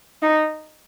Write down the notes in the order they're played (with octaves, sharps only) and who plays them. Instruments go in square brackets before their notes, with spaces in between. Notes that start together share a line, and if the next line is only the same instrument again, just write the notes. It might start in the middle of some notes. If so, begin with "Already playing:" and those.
[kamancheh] D#4